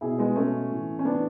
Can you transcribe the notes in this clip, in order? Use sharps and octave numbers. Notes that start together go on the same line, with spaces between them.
B2 E4 G#4
G#3 B3
B2 A3 C#4
A2 E3
C#4
A2 E3 B3 D4